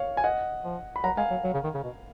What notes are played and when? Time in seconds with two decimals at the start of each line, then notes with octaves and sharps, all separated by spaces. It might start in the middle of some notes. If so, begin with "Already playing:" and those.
Already playing: C#5 F5
0.17 G#5
0.24 D#5 F#5
0.64 F3
0.96 B5
1.04 F#3 F#5 A#5
1.17 G#3 F5 G#5
1.31 F#3
1.44 F#3
1.54 C#3
1.64 D#3
1.74 C#3
1.84 B2